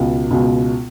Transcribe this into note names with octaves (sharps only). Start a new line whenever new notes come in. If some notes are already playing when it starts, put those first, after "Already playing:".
Already playing: C#2 B2
C#2 B2